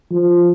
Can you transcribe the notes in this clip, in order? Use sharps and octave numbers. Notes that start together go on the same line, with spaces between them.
F3